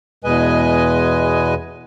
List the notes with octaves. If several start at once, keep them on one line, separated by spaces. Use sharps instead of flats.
E2 B2 G#3 B4 D#5 G#5